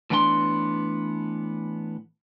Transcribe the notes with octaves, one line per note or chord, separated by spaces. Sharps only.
A2 E3 B3 D4 G5 C6